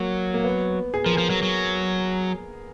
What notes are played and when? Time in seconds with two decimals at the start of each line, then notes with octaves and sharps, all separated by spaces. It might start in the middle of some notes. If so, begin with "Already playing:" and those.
Already playing: F#3 A#3
0.34 A#3
0.44 B3
0.94 G#4
1.04 F3 A#4
1.15 F3 G#4
1.30 F#3
1.43 F#3